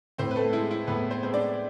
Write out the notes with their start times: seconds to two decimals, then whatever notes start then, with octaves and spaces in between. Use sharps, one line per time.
0.18 A2 C4 C5
0.31 B4
0.36 A3 A4
0.53 G#3 E4
0.71 E4
0.87 A2 B3 B4
1.11 C4 C5
1.23 G#3 C5
1.34 D4 D5